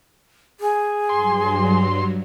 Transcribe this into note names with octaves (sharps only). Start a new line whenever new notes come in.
G#4
G2 F#3 C6